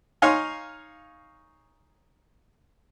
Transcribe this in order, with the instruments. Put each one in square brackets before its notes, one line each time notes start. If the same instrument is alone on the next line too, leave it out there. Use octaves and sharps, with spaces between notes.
[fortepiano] D#4 C#5 F5 G#5 C6